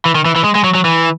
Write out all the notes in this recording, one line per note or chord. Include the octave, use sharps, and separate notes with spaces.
E3
D#3
E3
E3
G#3
G#3
F#3
F#3
E3